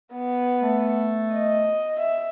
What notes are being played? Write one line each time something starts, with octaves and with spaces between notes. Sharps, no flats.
B3
A3
D#5
E5